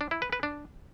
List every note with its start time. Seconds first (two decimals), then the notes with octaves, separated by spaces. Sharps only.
0.01 D4
0.11 E4
0.22 B4
0.33 B4
0.43 D4